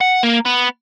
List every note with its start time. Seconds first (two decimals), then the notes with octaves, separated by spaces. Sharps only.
0.01 F#5
0.23 A#3
0.46 B3